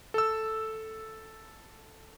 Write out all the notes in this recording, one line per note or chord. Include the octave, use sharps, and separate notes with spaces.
A4 E6